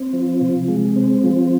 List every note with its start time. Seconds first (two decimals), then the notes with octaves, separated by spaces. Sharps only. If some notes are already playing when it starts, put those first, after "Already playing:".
Already playing: C4
0.13 F3
0.41 C3
0.68 G#3
0.96 C4
1.23 F3